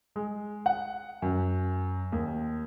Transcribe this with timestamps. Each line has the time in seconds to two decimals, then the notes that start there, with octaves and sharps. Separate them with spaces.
0.16 G#3
0.66 F#5
1.22 F#2
2.12 D#2